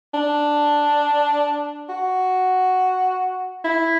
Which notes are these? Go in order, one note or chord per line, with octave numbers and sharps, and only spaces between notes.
D4
F#4
E4